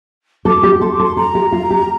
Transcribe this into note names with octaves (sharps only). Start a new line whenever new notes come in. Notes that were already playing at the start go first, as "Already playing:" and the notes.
A4 D6
G4
A4 C6
D6
A4
C6
A4 A#5
G4
F4
G4